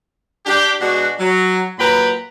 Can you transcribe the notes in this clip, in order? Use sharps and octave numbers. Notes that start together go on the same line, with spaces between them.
D4 G4
B2 G#3 D4 F#4
F#3
A#2 F#3 B4 G5 A#5 B5